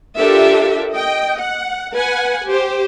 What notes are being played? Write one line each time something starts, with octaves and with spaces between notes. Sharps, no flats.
D4 F4 G4 A4 A#4 E5
D#5 G5
F#5
B4 F#5 G#5
G4 C5